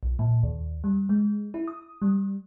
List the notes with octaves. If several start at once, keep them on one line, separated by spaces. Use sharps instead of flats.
B1
A#2
D#2
G3
G#3
E4
D#6
G3